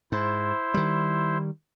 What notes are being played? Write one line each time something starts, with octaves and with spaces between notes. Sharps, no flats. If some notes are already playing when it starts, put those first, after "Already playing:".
G#2 E4 C5
D#3 G3